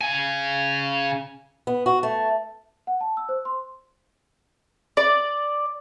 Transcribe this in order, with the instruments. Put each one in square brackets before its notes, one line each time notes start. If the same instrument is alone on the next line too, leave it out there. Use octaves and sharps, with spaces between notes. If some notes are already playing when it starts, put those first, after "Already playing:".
[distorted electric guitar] C#3 G#5
[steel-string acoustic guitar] B3
F#4
A3
[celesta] F#5
A5
E6
C5
C6
[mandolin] D5